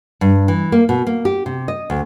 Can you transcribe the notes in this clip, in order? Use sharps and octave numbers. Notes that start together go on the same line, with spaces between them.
G2
E3
A#3
B2
A#3
G4
C3
D#5
D2